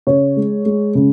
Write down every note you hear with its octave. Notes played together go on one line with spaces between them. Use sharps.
C#3 C#5
G#3
G#3
C#3